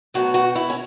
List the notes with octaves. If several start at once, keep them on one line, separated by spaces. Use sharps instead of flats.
B2 F#3 A3 F#4
F#4
E4
C#4